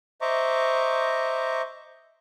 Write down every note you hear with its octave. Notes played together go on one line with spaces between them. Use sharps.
C5 D#5 E5 A#5 C#6 D6